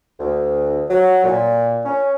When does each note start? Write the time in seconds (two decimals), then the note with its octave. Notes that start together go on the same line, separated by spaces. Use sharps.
0.19 D2
0.90 F#3
1.24 A#2
1.85 C#4